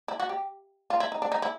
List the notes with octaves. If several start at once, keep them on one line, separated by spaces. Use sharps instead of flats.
E4
F#4
G4
F4
E4
D#4
D4
D#4
E4